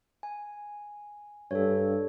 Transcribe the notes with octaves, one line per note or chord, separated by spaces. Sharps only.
G#5
G2 A4 C#5